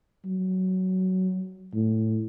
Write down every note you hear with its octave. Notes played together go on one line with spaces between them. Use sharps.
F#3
A2